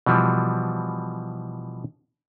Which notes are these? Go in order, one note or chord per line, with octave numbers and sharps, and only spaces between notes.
B2 E3 F3 G3